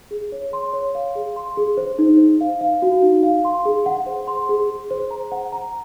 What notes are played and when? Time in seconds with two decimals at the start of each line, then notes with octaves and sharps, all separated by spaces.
0.11 G#4
0.32 C#5
0.53 C6
0.73 C#5
0.95 F5
1.15 G#4
1.36 C6
1.57 G#4
1.77 C5
1.99 D#4
2.19 C5
2.41 F5
2.61 F5
2.82 F#4
3.02 D#4
3.23 F5
3.45 C6
3.65 G#4
3.86 F#5
4.06 C5
4.27 C6
4.49 G#4
4.70 G#4
4.90 C5
5.11 A#5
5.32 F#5
5.52 A#5